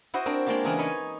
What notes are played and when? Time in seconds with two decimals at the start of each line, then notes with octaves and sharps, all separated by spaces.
0.14 E4 F#4 C5 D#5
0.26 C4 D4 A#4
0.46 G#3 A#3 D4 F4 G4
0.64 C#3 E3 D4 G#4 A#4 A#5
0.78 D#4 C#5 D#5 G#5 B5